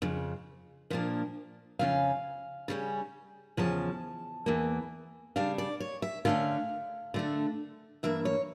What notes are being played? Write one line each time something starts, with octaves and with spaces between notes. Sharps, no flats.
F2 C#3
A#2 F3 A#3 D4
F2 C#3 F3 C#4 F5
C#3 G3 C#4
E2 C#3 F3 C#4 A5
E2 E3 A#3
C#3 G3 D4 F5
D5
C#5
E5
D3 A3 C#4 F5
D3 A3 D4
G2 E3 A#3 E5
C#5